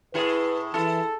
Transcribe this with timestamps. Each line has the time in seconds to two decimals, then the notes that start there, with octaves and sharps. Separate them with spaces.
0.14 A2 E4 G#4 B4
0.74 E3 E4 A4